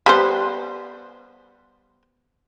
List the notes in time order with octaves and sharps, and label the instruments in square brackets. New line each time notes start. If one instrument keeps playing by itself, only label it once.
[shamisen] G3 B3 C5